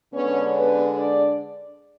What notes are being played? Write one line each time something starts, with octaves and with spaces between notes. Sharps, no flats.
D3 G#3 B3 C#4 D4 C#5
B3 B4
D4 D5